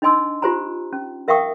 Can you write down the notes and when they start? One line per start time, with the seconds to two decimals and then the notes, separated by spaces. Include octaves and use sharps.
0.02 D4 D#4 D#5 G#5 C6 E6
0.42 F4 G4 C5 G#5 A#5
0.93 C#4
1.28 A#4 E5 F5 G5 C#6 D#6